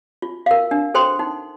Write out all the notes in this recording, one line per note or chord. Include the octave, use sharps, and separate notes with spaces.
F4
A#4 F5
D4
A4 C5 G5 C6
D#4